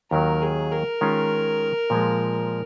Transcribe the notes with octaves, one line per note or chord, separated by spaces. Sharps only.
D#2 D#3 F#3 A#4
G#4
A#4
D#3 G#3 C#4 F4
A#2 F3 G#3